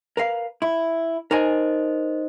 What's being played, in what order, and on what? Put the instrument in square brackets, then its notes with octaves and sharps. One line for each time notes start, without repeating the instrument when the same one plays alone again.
[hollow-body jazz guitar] A#4 B4 F5
E4
[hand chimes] D#4 C5 D#5 [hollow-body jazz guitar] A#4 F#5 G#5